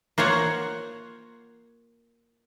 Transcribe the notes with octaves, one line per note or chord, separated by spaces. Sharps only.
A#3 F4 C5 C#5 F#5